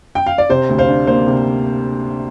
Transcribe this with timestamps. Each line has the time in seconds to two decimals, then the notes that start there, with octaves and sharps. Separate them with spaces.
0.15 G5
0.26 F5
0.38 D5
0.49 C3 C5
0.69 D2
0.78 C5 F5
0.88 D4
1.07 A#3 C5
1.27 C3